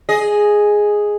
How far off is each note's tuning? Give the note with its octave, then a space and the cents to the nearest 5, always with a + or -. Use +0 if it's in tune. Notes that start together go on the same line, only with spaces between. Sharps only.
G#4 +0 D#5 +0